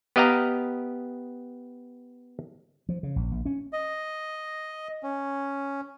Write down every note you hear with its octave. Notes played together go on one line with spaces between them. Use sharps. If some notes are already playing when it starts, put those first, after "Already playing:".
B3 G4 D#5 F5 G5 A#5
F3
C#3
A#1
A#1
C#4
D#5
C#4